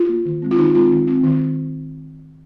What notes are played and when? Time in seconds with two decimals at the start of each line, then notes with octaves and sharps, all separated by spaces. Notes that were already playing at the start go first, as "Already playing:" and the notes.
Already playing: F4
0.09 A#3
0.25 D#3
0.42 G#3 C4
0.51 F4
0.58 D#3 D#4
0.75 G#3 C4 F4
0.91 D#3
1.07 C4
1.24 D#3